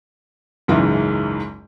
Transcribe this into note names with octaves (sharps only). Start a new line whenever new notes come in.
F#1 C#2 G#2 E3